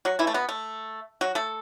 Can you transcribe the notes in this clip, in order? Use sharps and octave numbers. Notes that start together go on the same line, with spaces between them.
F#3 F#4
E3 E4
A3
B2 B3
A3
F#3 F#4
A3 A4